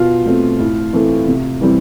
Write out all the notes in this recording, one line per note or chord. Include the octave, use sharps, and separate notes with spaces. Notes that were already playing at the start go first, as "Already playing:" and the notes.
Already playing: B2 F4
A3 C4
A2
E3 A3 C4
C3
E3 G3 C4